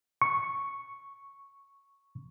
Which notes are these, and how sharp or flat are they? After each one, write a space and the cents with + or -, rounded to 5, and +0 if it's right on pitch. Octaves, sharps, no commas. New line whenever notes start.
C#6 -5